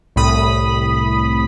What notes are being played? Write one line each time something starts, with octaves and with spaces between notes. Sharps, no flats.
C2 A2 B5 D#6